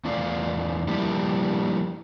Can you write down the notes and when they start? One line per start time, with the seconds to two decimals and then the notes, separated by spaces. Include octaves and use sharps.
0.05 E2 A3 F4 D5 F5
0.88 F3 G3 A#3 D4 E4 G4